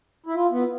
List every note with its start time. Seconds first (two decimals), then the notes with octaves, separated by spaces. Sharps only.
0.26 E4
0.35 F4
0.51 B3